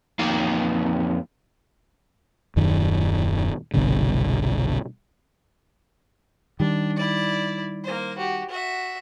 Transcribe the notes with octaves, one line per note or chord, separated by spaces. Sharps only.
F2 A#3 D#4 F5
D#1 F#2 D#3
G1 C2 B2 D3
D#3 G3 D4
E4 D5
A#3 C5
F#4 G4
F#4 E5